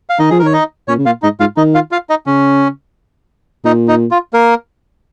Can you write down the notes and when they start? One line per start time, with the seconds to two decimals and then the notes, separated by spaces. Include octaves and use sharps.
0.09 F5
0.19 D#3 D#4 D#5
0.30 F3 G#4
0.39 A#4
0.43 D#3 C#5
0.53 D#4 D#5
0.88 A#2 C#4 C#5
0.98 C#3
1.06 A#2 F4 F5
1.22 G#2 D#4 D#5
1.40 G#2 F4 F5
1.57 D#3 D#4 D#5
1.74 F4 F5
1.91 F4 F5
2.10 D#4 D#5
2.26 C#3 C#4
3.64 A#2 D#4
3.88 D#4
4.11 F4
4.33 A#3 A#4